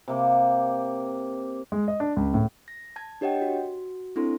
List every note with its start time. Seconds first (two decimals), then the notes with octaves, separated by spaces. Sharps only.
0.08 C3 A#3
1.72 G#3
1.88 D#5
2.00 D4
2.16 C#2
2.34 A2
2.68 A#6
2.96 A5 G#6
3.21 D4 G4 C#5 D#5 F#5 G5
3.42 F#4
4.16 C4 D4 E4 A4 C6